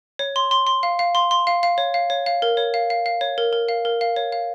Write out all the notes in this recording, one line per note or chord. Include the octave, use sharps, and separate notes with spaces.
C#5
C6
C6
C6
F5
F5
C6
C6
F5
F5
C#5
F5
C#5
F5
A#4
C#5
F5
F5
F5
C#5
A#4
A#4
F5
A#4
F5
C#5
F5